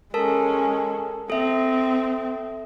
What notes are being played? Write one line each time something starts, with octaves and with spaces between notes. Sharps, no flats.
G#3 C#4 A4 A#4 A5
C4 A4 E5